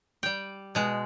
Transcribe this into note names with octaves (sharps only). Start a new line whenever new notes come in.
G3 G5
B2 G#3